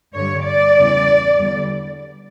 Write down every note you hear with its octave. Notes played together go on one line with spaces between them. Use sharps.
G2 D3 G3 C#5
D5
E2 C#3 E3 G3
E2 D3 G3